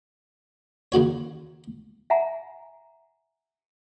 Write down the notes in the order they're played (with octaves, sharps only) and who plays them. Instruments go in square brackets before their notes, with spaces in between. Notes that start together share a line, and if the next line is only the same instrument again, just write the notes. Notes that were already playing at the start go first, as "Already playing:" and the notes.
[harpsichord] D#2 C#3 F#4 C#5
[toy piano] E5 F#5 G#5 A#5